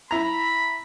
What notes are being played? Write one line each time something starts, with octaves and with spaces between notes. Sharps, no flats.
E4 A#5 B5